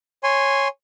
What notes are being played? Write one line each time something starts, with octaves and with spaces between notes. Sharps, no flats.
C#5 G#5 C6